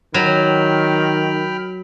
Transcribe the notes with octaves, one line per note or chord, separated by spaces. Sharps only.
D#3 F#3 G5 B5 F6